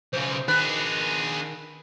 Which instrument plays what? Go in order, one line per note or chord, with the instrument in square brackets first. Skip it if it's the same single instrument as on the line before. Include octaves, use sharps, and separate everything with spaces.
[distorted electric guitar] B1 C#3 [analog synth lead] C5
[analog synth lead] D#3 [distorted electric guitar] D4 G#4 [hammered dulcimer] B4